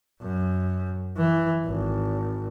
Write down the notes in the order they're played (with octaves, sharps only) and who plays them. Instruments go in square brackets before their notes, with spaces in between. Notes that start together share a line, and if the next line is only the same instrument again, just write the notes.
[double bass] F#2
E3
G#1